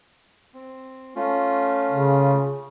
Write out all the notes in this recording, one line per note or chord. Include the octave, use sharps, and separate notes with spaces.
C4
A3 C#4 F4
C#3